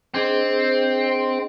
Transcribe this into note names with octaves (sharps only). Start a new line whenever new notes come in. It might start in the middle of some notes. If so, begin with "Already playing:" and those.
C4 D4 G#4 D#5